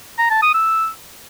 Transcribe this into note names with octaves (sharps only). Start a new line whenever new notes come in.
A#5
A5
D#6
E6